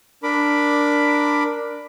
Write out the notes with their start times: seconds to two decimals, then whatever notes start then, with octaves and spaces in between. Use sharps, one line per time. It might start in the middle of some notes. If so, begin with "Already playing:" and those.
0.23 D4 A#4 B5 D6